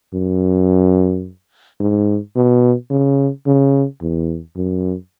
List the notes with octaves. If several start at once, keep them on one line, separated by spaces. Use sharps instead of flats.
F#2
G#2
B2
C#3
C#3
E2
F#2